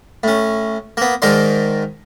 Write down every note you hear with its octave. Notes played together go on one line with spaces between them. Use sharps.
A2 C#4
A#3 B3
G#2 D#3 A#4 D5 C6